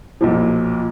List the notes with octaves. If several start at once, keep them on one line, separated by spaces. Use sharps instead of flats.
B1 A#2 F3